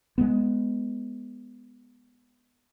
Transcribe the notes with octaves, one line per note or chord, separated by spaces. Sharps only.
G#3 A3 B3